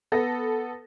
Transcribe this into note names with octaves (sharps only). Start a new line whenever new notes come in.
B3 A4 A#6